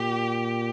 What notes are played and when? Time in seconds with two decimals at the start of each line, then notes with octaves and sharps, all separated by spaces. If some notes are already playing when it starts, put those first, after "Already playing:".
Already playing: A#2 G4